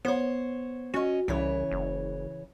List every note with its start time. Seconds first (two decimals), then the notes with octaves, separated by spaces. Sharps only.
0.05 B3 C5 C#5
0.94 C#4 F#4 D#5
1.28 C2 C#3 E3 C#5
1.71 F#1